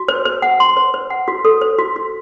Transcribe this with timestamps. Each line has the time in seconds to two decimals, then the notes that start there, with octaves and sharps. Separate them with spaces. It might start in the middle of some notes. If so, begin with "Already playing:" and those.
Already playing: F#4
0.08 C5
0.25 C5
0.42 F#5
0.60 C6
0.77 C5
0.94 C5
1.10 F#5
1.28 F#4
1.45 A4
1.61 C5
1.79 F#4
1.96 F#4